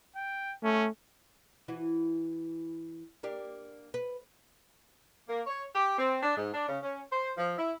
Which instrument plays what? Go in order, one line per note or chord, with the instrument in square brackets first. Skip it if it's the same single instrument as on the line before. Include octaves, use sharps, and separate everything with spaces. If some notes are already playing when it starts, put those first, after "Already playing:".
[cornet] G5
[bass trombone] A3 [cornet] C#4
[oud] E3 E4 F#4
A#3 D4 G4
B4
[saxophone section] A#3
C#5
G4
C4
D4
G#2
D4
C#3
C#4
C5
F3
E4